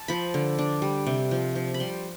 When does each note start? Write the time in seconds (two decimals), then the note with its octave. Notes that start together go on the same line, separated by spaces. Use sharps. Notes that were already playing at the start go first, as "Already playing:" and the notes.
Already playing: A5
0.08 F3 B5
0.34 D3
0.59 D4
0.82 G3
1.06 C3
1.31 F3
1.55 F3
1.74 B5
1.80 G3 C6